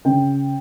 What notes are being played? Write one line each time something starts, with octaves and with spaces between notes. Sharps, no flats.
C#3 G5